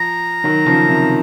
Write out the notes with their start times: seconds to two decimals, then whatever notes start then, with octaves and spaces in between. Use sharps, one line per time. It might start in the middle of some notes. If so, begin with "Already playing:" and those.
Already playing: F3 A#5
0.44 D#3 F#3
0.66 C#3 F3
0.88 C3 D#3